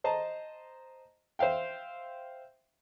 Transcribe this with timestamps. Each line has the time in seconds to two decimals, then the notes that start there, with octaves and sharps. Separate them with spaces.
0.04 C5 D#5 A5 A#5
1.39 C5 E5 F5 G5